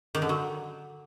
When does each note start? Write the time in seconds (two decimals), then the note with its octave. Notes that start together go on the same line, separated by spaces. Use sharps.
0.15 D#3
0.22 D3
0.29 F#3